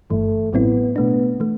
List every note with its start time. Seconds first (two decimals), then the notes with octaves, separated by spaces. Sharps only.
0.10 G1 G2 E3 A3
0.53 A1 A2 F#3 B3 C4 E4
0.96 B2 A3 B3 D4
1.40 E3 A3